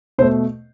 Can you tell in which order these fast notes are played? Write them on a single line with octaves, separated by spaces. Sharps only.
B2 C5 A3